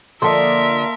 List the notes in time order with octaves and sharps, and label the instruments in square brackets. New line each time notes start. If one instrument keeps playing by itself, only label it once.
[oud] D3 F3 [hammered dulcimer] A#3 A4 D#5 [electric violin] A#4 E5 [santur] C6